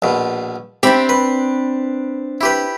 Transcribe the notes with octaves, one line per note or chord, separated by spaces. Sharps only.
A#1 B2
C4 D4 G4 E5 B5
B4
E4 G4 B4